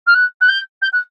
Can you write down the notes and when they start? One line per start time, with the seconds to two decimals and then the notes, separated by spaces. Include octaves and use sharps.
0.06 F6
0.14 F#6
0.40 F#6
0.48 G6
0.82 G6
0.92 F#6